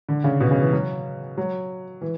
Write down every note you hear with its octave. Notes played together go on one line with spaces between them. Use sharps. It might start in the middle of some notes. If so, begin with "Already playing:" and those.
D3
C#3
B2
C#3
E3
F#3
F#3
E3